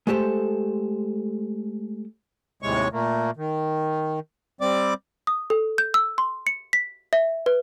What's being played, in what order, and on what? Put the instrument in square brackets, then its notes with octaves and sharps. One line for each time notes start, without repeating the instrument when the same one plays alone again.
[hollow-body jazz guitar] G#3 A3 G4 A4 C5
[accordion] D#2 A2 C3 G#3 C#5 C#6
A#2 A3 A#3
D#3
G3 C4 D5 D6
[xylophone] D#6
A4
G6
E6
C6
C#7
B6
E5
B4